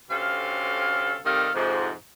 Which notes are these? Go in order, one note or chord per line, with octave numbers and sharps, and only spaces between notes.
D2 C3 C#4 A4 F5
C3 D#3 G3 A4 D#5 F5
F2 G#2 C3